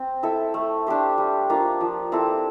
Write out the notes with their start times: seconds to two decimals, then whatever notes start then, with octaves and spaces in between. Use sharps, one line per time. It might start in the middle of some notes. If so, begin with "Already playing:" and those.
Already playing: C4
0.23 E4 A4 E5
0.54 A3
0.87 D4 G4 C5
1.18 G3
1.49 A#3 D4 F4
1.81 F3
2.12 C4 E4 A4